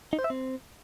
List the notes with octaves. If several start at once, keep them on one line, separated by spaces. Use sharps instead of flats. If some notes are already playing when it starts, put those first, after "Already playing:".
D#4
C5
E5
C4